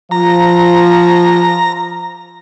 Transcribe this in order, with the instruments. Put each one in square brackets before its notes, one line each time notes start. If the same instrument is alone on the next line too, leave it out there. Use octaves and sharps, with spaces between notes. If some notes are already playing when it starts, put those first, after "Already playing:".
[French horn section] F3 [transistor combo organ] A#5